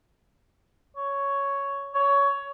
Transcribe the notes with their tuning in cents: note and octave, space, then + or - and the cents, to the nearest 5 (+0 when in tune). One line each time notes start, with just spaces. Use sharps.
C#5 +5
C#5 +15